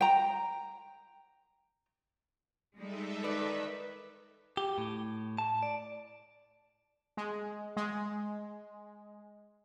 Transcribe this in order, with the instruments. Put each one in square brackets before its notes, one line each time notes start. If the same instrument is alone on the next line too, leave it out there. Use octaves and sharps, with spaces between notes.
[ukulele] G5 A#5
[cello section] G3 G#3 [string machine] D#4 A4 E5
[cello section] D#3 [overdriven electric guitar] B4 [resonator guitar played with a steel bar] D5
[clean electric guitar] G4
A2
A5
D5
[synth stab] G#3
G#3